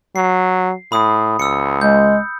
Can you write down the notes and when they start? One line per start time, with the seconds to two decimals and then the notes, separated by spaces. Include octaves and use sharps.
0.16 F#3 C7
0.92 A2 B5 D#6
1.39 C#2 E6 C#7
1.81 G#3 G6